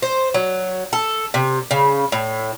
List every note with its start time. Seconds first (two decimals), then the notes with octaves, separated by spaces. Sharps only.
0.02 C5
0.34 F#3
0.93 A4
1.34 C3
1.71 C#3
2.12 A2